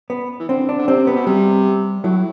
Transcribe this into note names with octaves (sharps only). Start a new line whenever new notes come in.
B3
E3
D3 C4
D4
D3
C3 C4
B3
B2
C3 G3
A2 F#3